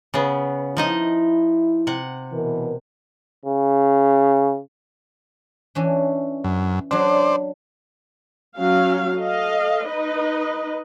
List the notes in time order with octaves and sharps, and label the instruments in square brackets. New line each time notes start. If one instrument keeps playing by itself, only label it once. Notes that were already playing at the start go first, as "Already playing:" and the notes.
[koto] C#3 B3
[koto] F3 D#4 D#5 [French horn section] E4
[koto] C3 F#5
[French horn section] B2 E3 A#4
[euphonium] C#3
[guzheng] E3 C#4 D4
[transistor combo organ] F#2
[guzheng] F#3 D4 [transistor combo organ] C5 D5
[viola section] F#3 C#4 F5
A4 D#5 F5
D#4 B4 D#5